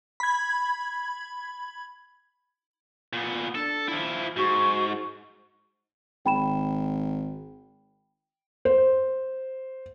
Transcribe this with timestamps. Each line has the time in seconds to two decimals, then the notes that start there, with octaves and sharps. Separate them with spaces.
0.20 B5 G#6
3.13 A#2 B3
3.55 D4 A4
3.88 F3 E4
4.36 G#2 F#4
6.26 G#1 G5 B5 E7
8.65 C5